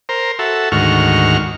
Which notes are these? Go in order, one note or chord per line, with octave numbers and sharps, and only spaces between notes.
A#4 C5
F#4 A4 E5
D2 G#2 D#3 F#4 C#6 F6